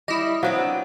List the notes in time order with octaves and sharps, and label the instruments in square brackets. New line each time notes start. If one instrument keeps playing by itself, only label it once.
[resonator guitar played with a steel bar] G3 [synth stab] E4 D#5
[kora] F#3 [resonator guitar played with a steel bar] B3 C4 D4 [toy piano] C5 F5